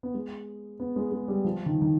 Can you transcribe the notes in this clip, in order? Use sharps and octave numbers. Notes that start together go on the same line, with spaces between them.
B3
G#3
B3
G#3
G#3
G3
F3
D#3
D#3